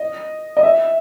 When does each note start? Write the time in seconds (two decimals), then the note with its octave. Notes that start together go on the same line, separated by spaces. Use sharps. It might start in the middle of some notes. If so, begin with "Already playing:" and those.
Already playing: D#5
0.57 D#5
0.63 E5